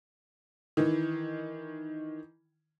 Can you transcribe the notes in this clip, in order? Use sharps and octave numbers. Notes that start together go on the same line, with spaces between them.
D#3 E3